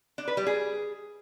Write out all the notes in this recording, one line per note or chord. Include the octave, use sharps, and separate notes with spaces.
D4
B4
G3
G#4